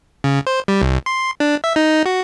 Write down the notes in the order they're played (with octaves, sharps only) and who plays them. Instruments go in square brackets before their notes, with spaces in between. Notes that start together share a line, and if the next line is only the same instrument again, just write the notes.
[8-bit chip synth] C#3
C5
G3
C2
C6
D4
E5
D#4
F#4